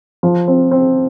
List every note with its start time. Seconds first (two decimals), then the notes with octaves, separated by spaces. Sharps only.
0.23 F3
0.48 C4
0.71 C4